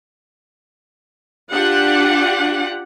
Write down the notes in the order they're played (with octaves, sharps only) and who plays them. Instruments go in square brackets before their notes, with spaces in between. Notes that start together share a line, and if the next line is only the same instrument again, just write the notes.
[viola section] D4 F4 G4 F#5